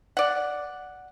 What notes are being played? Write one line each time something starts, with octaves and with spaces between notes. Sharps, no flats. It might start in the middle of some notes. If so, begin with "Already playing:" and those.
D5 F#5